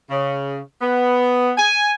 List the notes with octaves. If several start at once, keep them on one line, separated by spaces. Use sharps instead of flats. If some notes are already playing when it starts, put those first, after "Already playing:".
C#3
B3
G#5